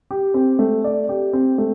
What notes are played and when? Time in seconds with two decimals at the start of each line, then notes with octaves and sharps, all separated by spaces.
0.11 G4
0.34 C4
0.59 A3
0.84 D5
1.09 G4
1.33 C4
1.58 A3